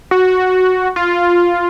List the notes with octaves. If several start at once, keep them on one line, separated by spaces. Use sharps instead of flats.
F#4
F4